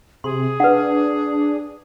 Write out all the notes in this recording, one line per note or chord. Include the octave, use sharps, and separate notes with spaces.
C3 G#4 C6
D4 B4 F#5